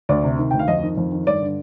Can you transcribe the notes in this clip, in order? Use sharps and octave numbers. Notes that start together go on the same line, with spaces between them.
D2 D5
C3
D#3
D2 G5
F5
F2 D#5
D#3
F2
D#3
G2 D5
D3